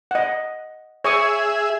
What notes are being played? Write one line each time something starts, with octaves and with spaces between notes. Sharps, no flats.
D#5 F#5
G#4 C#5 E5 C#6 D#6